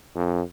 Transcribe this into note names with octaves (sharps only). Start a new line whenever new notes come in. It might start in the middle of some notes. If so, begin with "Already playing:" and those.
F2